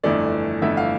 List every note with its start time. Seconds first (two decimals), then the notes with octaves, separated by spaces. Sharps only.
0.04 G1 F2 E3 A3 D5
0.62 G1 F2 E3 A3 E5
0.77 F5